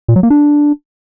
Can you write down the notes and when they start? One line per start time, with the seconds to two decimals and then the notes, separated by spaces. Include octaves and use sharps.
0.08 A#2
0.16 F#3
0.23 A#3
0.30 D4